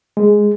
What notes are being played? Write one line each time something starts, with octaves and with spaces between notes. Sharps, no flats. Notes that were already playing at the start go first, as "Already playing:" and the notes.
G#3